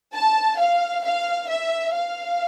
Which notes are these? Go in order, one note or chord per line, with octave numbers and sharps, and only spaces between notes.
A5
F5
F5
E5
F5